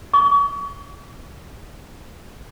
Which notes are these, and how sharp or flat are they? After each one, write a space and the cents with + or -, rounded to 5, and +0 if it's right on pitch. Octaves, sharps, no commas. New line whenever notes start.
C#6 +35